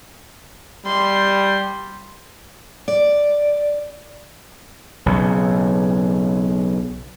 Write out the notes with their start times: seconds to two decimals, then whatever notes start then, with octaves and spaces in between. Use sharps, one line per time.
0.86 G3 C6
2.88 D5
5.06 B1 C#3